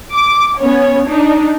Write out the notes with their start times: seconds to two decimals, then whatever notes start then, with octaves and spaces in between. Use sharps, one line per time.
0.13 D6
0.59 B3 C#4 C#5
1.06 D4 D#4